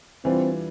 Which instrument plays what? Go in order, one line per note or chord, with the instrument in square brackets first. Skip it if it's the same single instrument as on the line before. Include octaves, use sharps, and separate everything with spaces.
[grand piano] E3 G3 D4 F4 [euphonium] C4